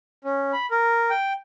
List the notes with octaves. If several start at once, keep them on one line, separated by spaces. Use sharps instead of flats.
C#4
B5
A#4
G5